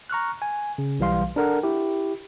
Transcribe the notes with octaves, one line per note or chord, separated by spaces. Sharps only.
A#5 C#6 F6 F#6
G#5
C#3
B1 E3 G3 F5 C6
D4 A4 A#4 F#5
E4 G4